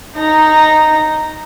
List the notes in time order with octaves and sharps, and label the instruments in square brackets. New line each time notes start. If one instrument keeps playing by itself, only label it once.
[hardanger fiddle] D#4 A#5